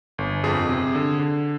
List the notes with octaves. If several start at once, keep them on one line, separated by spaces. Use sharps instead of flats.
G1
F2 G#4
C3
D3
D3